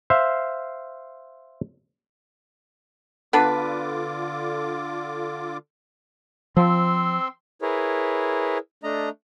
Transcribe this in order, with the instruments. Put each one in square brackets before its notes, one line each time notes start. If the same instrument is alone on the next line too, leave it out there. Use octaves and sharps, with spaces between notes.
[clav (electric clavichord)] C5 E5 F5
[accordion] D3 F4 D6 [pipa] B3 D4 B4
[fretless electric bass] F3 [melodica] C4 C6 E6
[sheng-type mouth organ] E4 G#4 A#4 B4 C#5
A3 D4 D#5 A#5